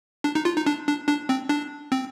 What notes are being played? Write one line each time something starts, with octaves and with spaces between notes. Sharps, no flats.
D4
D#4
F4
D#4
D4
D4
D4
C4
D4
C4